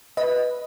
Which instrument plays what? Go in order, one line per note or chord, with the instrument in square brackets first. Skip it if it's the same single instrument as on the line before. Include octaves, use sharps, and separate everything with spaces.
[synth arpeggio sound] B4 D#5